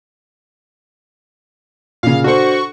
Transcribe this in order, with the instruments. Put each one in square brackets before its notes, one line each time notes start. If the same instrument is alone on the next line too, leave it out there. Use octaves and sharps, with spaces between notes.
[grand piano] A#2 C#3 [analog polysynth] F5
[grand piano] D4 A4 C5 [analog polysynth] F#4 C#6